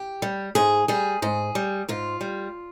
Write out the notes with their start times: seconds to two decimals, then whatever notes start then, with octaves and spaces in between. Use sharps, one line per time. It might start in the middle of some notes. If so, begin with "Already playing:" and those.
Already playing: G4
0.22 G3
0.55 G#2 G#4
0.88 G3 G#4
1.22 G#2 G#4
1.55 G3
1.88 G#2 F4
2.21 G3